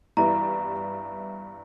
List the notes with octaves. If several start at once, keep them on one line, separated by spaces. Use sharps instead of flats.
G2 E3 G3 B3 E4 A#5